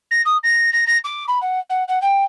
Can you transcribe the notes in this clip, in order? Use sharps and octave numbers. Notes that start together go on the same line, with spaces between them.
A#6
D#6
A#6
A#6
A#6
D6
B5
F#5
F#5
F#5
G5